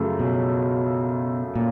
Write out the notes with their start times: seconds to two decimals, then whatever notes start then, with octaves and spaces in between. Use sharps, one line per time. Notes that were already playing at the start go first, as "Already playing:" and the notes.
Already playing: F#2 C#3 F3 A3
0.20 B2
1.56 A#2